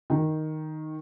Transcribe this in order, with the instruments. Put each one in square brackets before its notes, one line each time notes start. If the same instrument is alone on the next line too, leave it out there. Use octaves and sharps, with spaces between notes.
[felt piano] D#3